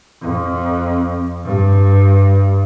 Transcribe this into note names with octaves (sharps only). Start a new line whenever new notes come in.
F2
G2